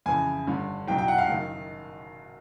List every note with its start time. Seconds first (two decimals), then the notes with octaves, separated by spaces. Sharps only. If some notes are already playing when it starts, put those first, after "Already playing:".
0.06 F2 C#3 E3 G#5
0.47 G1 G2 D3
0.88 B1 B2 F#3 G5
0.98 G5
1.08 F#5
1.18 F5
1.29 F#1 F#2 D#3